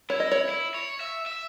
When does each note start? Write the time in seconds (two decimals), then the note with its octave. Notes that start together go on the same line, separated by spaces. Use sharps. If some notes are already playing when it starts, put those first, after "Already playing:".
0.10 E4 C#5
0.20 D#5
0.32 C#5
0.49 E4
0.74 C#5
1.00 E5
1.26 E5